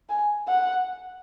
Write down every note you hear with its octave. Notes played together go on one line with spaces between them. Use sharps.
G#5
F#5